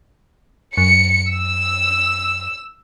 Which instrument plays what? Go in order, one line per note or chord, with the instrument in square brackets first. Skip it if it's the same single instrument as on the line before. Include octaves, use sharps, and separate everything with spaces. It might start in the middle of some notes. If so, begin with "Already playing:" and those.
[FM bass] F#2 [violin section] C#7
[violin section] E6